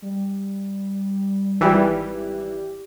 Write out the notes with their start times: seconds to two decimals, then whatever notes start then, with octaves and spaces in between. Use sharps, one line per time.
0.02 G3
1.60 G#1 E3 G3 G4